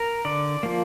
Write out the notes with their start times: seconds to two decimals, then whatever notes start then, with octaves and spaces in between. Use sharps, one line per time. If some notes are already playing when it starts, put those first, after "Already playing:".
Already playing: A#4
0.25 D3 D5
0.63 F3 A#3